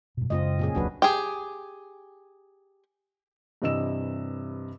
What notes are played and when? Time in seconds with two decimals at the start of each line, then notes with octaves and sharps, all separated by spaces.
0.17 G2 B2
0.30 F#2 C#3 G#3 C4 F4 D#5
0.59 A#2 C#4 G#4
0.75 E1 C#2 F#3 D4 F#4 B4
1.02 G4 G#4
3.62 G2 C3 E3 D#5 E6 E7